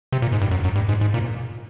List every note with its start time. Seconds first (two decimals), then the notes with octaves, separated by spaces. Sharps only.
0.12 C3
0.22 A#2
0.32 G#2
0.42 G2
0.51 F#2
0.64 F#2
0.76 G2
0.89 G#2
1.01 G#2
1.14 A#2